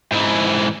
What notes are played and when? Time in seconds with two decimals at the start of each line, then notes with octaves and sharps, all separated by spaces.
0.12 G#2 E3